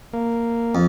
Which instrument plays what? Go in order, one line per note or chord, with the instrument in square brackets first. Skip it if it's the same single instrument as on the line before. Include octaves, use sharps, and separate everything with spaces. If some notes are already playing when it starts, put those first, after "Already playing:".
[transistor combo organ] A#3
[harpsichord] F2